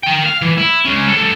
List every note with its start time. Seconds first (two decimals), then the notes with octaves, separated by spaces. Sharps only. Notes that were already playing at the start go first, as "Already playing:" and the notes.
0.03 A#4 G5
0.25 F5
0.42 E3
0.58 E4
0.85 G#3 C#4
1.07 C#2 A4